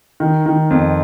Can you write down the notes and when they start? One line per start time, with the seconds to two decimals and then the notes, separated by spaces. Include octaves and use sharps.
0.20 D#3
0.46 D#3
0.70 F2